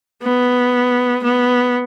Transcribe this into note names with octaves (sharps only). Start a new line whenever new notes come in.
B3
B3